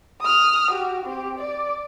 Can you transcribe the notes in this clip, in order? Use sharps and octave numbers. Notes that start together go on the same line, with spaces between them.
D#6 F6
F#4 G4
C4 G4
D5